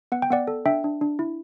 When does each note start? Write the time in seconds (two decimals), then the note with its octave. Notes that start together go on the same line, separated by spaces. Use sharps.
0.12 B3 F#5
0.22 G5
0.31 B3 D5 F#5
0.47 A4
0.65 D4 E5 G5
0.84 D4
1.01 D4
1.19 E4